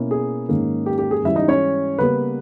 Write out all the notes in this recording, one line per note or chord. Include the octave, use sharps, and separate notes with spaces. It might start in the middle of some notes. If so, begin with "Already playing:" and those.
Already playing: B2 A#3 C#4 E4
G#4
G#2 D#3 A#3 C#4
G4
G4
G#4
G#2 E3 G3 C#4 E4 E5
D#4 D#5
C#4 C#5
C#3 G3 A#3 B3 B4